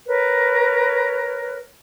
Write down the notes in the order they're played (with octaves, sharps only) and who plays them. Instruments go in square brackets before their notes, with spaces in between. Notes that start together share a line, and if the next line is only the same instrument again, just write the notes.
[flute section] A#4 B4 C#5